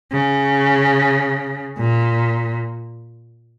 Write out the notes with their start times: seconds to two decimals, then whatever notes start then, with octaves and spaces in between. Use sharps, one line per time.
0.12 C#3
1.78 A#2